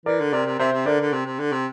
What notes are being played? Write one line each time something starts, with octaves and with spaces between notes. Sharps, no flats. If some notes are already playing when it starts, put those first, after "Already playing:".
E3 A#4 D5
D3
C3 A#4 D5
C3
C3 C5 E5
C3
D3 A#4 D5
D3
C3
C3
D3
C3